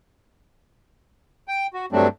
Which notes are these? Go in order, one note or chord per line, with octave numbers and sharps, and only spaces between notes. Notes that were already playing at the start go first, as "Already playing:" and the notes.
G5
F#4
G2 F#3 G3 A3 C4 D4